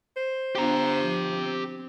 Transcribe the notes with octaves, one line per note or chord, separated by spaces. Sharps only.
C5
B3 D4 F4 G4 A#5
F3
C4